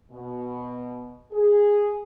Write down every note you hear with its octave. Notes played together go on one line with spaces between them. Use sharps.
B2
G#4